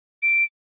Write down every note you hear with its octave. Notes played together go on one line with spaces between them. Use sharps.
D7